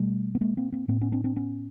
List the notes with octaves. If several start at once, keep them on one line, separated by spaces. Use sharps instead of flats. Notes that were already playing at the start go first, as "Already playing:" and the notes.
Already playing: B2 G3 A3
B3
G#3 A#3
A#3 C4
A#3 C4
A2 A#3 C4
B3 C#4
C4 D4
C4 D4
B3 C#4